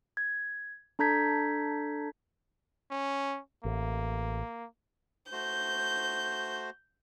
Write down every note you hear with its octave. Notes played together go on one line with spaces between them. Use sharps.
G#6
D4 A4 A#5 G6 G#6 B6
C#4
A1 A#3
A3 F#4 C5 G6